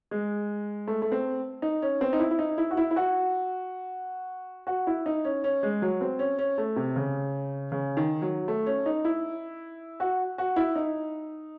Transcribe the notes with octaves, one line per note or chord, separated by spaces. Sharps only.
G#3
A3
A3
C4
D#4
C#4
C4
D#4
E4
E4
D#4
E4
F#4
E4
E4
F#4
F#4
E4
D#4
C#4
C#4
G#3
F#3
C4
C#4
C#4
A3
C3
C#3
C#3
D#3
F#3
A3
C#4
D#4
E4
F#4
F#4
E4
D#4